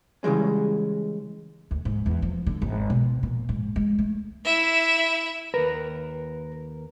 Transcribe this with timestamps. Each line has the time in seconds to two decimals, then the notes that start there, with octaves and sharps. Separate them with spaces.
0.23 C#3 E3 G3 G#3 C#4
1.71 D2
1.85 G#2
2.06 E2
2.22 F3
2.46 D3
2.62 G#1
2.90 B2
3.23 A#2
3.49 G#2
3.76 G#3
3.99 A3
4.45 E4 E5
5.54 D#2 A#4 B4